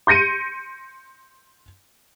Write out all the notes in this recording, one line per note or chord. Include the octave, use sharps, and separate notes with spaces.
C6 G6 A#6 C#7 D#7